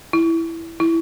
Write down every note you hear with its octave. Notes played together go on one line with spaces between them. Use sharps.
E4
E4